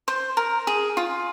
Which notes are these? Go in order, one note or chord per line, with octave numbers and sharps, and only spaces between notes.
C5
A#4
G#4
F4